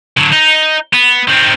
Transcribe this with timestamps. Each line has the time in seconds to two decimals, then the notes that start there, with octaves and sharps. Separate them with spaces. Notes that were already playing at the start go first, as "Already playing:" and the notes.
0.18 D3 F#3
0.33 D#4
0.94 B3
1.28 D#3 C4